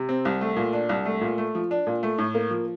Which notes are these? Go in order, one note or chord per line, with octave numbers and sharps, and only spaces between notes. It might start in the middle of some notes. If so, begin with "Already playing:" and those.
Already playing: C3
C4
C2
A3
A#2
D4
C2
A3
A#2
A3
F3
D4
A#2
A3
A2
A#3
F3